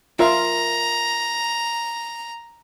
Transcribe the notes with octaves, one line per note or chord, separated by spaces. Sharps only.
F4 A#4 E5 F5 A#5